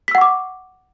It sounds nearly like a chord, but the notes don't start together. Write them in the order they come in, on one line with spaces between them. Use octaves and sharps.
B6 E6 F#5 C#6 D6